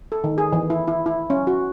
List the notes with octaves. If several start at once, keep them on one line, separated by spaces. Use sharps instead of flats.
A4
D#3
G#4
E3
E4
E4
E4
C#4
F#4